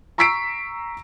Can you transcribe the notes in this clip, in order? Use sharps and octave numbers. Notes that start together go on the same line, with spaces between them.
A#5 C#6 E6 B6 C7 D7